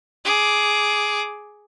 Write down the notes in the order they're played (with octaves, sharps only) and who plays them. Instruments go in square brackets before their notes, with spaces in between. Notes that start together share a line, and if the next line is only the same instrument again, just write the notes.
[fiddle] G#4 D6